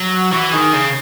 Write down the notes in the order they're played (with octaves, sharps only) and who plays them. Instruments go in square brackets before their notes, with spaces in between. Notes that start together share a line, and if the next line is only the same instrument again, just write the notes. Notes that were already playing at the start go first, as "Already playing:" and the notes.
Already playing: [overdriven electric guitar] F#3
[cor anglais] F#4
[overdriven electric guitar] E3 [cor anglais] F#4
[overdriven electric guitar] D#3 [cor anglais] G#4
[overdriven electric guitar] C#3 [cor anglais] G#4